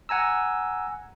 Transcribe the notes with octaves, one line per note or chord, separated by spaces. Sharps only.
F#5 G#5 A#5 E6